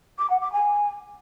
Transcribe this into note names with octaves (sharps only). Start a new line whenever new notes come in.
D6
F#5
D6
G#5